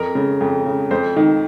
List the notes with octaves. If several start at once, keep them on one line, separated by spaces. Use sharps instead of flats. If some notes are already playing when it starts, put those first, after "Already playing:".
Already playing: F2 A#4
C#3
F2
C#3
F2 C5
D#3